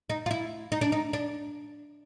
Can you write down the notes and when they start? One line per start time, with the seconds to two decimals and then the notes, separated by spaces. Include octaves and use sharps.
0.10 D#4
0.26 F4
0.31 E4
0.72 D#4
0.81 D4
0.92 D#4
1.13 D4